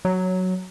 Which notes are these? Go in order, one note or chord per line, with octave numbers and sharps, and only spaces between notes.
F#3